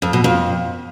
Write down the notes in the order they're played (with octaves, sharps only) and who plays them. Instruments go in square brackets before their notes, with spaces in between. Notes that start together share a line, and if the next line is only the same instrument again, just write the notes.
[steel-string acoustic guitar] F2
B2
F2